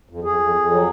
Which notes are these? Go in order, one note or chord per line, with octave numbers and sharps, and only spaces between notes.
F2
F2 G#4
F2
F2
F#3